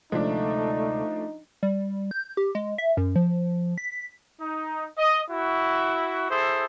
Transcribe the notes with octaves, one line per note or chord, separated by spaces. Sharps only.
D2 C3 F3 G#3 A3 D4 D#4
G3
G6
G4
G#3
E5
F#2
F3
B6
D#4
D#5
E4 F#4
E4 G#4 A4 C5